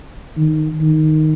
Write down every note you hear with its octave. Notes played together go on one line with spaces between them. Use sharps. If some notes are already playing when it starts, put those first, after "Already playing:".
D#3
D#3